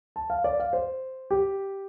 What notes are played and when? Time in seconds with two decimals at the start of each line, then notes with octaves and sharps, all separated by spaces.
0.16 A5
0.30 F5
0.44 D5
0.60 F5
0.73 C5
1.31 G4